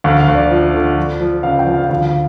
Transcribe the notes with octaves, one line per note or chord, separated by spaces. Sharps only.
D2 F5
F5
D2
D5
F3
D3
F3
F3
C#2 F5
G5
F3
F5
D2 F5
F5